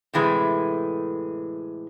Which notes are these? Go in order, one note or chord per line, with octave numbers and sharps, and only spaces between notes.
A2 C3 E3 G#3 A3